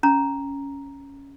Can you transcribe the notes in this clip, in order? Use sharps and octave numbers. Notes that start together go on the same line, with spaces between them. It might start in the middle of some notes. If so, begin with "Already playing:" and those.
C#4 A#5